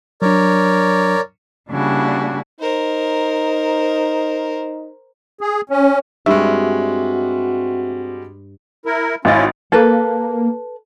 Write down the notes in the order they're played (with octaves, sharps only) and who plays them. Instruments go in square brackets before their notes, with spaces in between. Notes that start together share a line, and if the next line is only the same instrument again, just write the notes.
[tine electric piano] F#3 D4 [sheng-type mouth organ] A#4 C#5 D5
[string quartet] C#3 G3 A#3 D4 E4 F#4
[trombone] D#4 [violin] A#4 C5
[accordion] G#4
C#4
[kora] G2 [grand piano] G3 G#3 [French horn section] C4 F#4 [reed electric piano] E5
[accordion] E4 A#4
[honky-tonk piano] G#1 D#5 A6 [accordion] C#4 E4 F4
[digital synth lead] A#3 [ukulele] A4 B4